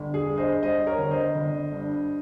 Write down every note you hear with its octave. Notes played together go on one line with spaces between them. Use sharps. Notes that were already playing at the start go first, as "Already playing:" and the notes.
Already playing: G1
G#4
G2
C5 D#5
G3 C5 D#5
A#4 C#5
G1
C5 D#5
G1
G2